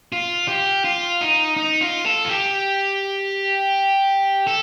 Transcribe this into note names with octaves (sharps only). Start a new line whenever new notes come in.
F4
G4
F4
D#4
D#4
F4
A4
F4
G4
A4